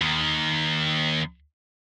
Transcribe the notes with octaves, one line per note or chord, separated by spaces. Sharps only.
D#2 D#3